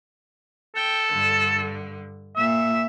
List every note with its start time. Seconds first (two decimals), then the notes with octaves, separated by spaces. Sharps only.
0.75 A4 G5
1.12 G2 D3
2.36 A#2 E5